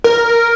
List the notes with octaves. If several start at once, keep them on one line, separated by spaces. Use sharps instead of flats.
A#4